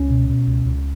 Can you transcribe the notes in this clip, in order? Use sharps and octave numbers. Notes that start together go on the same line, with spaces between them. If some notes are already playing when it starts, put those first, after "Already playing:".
Already playing: C#2 C#4
B2
B2
C#2
C#2